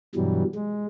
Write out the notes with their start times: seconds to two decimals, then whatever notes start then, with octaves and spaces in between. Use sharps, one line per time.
0.15 G2 B2 E3 F#3 G3
0.55 G#3